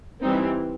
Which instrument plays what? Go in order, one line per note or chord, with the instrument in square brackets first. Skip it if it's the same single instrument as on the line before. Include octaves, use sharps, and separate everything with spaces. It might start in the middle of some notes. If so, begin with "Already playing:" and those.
[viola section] E3 G3 C4 D#4